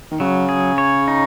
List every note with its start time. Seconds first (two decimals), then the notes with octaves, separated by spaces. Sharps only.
0.11 D#3
0.20 C#3 F#3
0.49 G#4
0.78 C#5
1.08 D#4